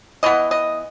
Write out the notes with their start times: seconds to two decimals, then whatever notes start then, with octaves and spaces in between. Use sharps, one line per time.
0.23 E3 B3 D#5
0.51 D#5